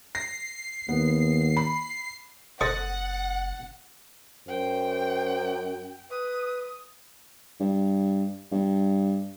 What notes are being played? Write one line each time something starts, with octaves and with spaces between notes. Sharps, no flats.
A#6 C7
D#2 B3
B5
F#1 A4 C5 D#5 F#5 D#6 A6 A#6
F#2 C5 G5
B4 D#6
G2
G2